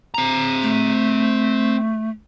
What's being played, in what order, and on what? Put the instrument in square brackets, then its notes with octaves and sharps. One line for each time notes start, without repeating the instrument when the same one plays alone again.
[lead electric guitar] C4 A#5
[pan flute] A3